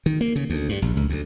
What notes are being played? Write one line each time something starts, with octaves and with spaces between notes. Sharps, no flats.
D#3
A#3
C#3
D2
G2
A#1
C#2
D2